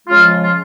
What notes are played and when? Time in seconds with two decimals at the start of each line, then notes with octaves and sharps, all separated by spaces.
0.06 C#3 F3 G#3 F4
0.42 F4